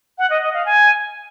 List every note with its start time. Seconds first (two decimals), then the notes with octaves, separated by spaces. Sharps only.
0.18 F#5
0.30 D#5
0.41 D#5
0.53 F5
0.65 G#5